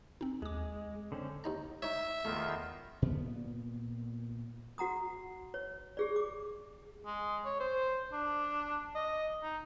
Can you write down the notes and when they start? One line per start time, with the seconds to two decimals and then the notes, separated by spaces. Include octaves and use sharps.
0.21 C4 D#4
0.42 D#2 G#3 D6
1.12 D3 C4 C#4
1.44 D#2 D#4 A#5
1.83 D#4 C#5 E5
2.25 E2 D#3 A3 F4
3.02 A#2 B3
4.78 F#4 F#5 A#5 D#6
5.54 C#5
5.97 G4 G#4 D5
6.16 D6
7.06 G#3
7.46 C#5
7.60 C5
8.13 D4
8.96 D#5
9.43 D#4